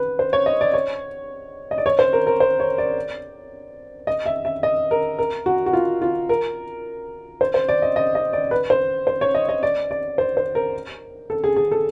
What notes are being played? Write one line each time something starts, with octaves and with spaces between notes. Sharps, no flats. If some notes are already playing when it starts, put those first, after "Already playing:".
Already playing: B4
C5
C#5
D#5
D5
C#5
D#5
D5
C#5
C5
A#4
A#4
C5
C#5
D5
D#5
E5
E5
D#5
A#4
A#4
F#4
F#4
F4
F4
A#4
C5
C5
D5
D#5
D#5
D#5
D5
B4
C5
C5
C#5
D#5
D#5
D5
D5
C5
C5
A#4
A4
G#4
G#4
A4